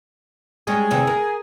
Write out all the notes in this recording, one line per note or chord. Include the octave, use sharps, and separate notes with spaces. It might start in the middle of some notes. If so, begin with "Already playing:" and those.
G3 G#3 C#4 G#4
E2 C3 D#3
A#4